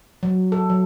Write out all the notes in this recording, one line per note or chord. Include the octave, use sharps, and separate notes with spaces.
F#3
A4
F#3